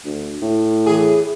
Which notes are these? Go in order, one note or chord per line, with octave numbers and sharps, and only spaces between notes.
D2
A2
E3 G#4